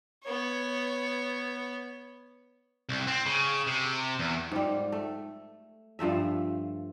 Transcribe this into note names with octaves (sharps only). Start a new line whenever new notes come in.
B3 C#5
C2
C4
C#3
C3
E2
G#2 G3
A3
G2 F3 A3 E5